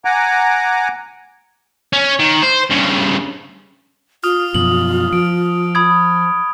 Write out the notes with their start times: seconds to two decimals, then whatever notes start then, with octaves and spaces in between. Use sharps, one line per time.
0.05 F#5 G#5 A#5 D6
1.93 C#4
2.19 D#3
2.42 C5
2.70 G2 C#3
4.24 F4 D#6 F6
4.55 F#2 B2 F3 F#7
5.13 F3 D7
5.75 B5 D#6 G#6